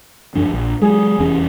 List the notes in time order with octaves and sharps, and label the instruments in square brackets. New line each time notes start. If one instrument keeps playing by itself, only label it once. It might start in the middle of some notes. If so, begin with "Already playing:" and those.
[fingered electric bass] F#2 F3 D4
D1 A#1
[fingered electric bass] F#3 G#3 [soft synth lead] G#4
[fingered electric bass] F1 E2 C#4